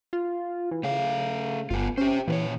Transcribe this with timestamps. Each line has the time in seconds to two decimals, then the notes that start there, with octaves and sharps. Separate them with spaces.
0.13 F4
0.71 E3
0.84 C#3 A3 F5
1.71 G1 B3 F4
1.98 C#4 G4 C5
2.28 A#2 E3 B4 C#5